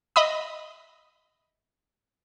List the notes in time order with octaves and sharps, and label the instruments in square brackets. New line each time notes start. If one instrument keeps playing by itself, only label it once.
[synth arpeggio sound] D#5 E5 B5 D#6